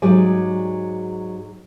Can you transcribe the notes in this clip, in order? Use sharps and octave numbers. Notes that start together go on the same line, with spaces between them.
G#2 F#3 G4 G#4 D5 G#5